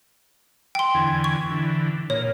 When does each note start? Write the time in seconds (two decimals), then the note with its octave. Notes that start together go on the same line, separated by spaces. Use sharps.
0.75 G5 C6
0.95 E2 D3 G#5
1.24 C#6
1.50 D3 E3
2.10 A#2 C#5